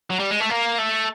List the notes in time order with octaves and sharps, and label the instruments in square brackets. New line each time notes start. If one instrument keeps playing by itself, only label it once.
[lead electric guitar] F#3
G3
G#3
A3
A#3
A3